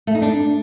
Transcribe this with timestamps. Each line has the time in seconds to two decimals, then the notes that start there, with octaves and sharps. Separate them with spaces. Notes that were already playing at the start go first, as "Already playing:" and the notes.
0.07 A3
0.15 D#4
0.22 D4